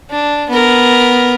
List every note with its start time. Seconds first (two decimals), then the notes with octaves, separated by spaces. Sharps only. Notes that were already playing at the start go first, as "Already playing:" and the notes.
0.10 D4
0.49 B3 A#4